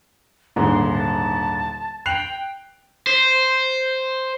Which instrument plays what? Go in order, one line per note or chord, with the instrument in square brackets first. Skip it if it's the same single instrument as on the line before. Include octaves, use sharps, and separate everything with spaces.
[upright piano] D#1 G#2 D3 [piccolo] C6
[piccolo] A5
[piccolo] G5 [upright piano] F#6 C7 F7
[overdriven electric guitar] C5